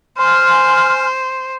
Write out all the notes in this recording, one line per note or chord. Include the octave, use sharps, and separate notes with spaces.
C5 G#5 C6 F6